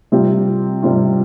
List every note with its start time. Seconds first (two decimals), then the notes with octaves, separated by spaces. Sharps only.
0.12 C3 G3 C4 F4
0.83 C3 G3 C4 F4